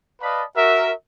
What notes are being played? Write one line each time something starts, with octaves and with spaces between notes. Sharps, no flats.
B4 D5 D#5 F5 A5 B5
F#4 A#4 E5